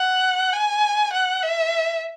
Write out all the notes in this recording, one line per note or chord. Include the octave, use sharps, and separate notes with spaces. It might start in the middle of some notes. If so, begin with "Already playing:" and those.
Already playing: F#5
G#5
F#5
E5